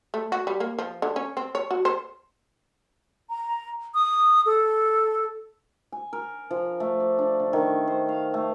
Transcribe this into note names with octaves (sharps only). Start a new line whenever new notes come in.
A3
F#4
G3
A#3
F3
D3
C#4
C4
C#5
F#4
C5
A#5
D#6
A4
G#5
A#4
F3
A3
D5
D4
D3
D#3
C5
F5
A3